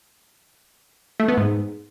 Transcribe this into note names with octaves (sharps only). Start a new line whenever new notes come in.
A3
B3
G#2